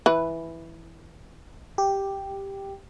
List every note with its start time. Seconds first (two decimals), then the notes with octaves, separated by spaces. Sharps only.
0.06 E3 B4
1.78 G4